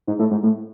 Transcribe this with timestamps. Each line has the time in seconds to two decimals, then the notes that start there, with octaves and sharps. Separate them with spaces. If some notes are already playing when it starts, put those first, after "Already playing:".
0.07 G#2
0.19 A2
0.31 G#2
0.43 A2